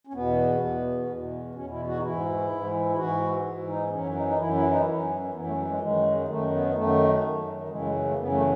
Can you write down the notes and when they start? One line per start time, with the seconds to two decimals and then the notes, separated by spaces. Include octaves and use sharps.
0.07 C#4
0.13 E2 B2 B3
0.60 E2 B2
1.08 E2 B2
1.55 E2 B2 C#4
1.70 E4
1.87 F#4
1.98 D#4
2.02 G#2 E3 E4
2.50 G#2 E3
2.90 E4
2.96 G#2 E3 F#4
3.44 G#2 E3
3.67 D#4
3.87 B3
3.91 F#2 E3 C#4
4.15 D#4
4.27 D#4
4.38 F#2 E3 E4
4.54 E4
4.70 D#4
4.85 F#2 E3 C#4
5.32 F#2 E3 B3
5.45 A3
5.57 F#3
5.68 G#3
5.80 F#2 D#3 G#3
6.28 F#2 D#3 A3
6.51 B3
6.74 F#2 D#3 A3
7.22 F#2 D#3
7.69 F#2 C#3 E3 G#3
7.82 G#3
8.05 A3
8.16 F#2 C#3 E3 B3
8.32 A3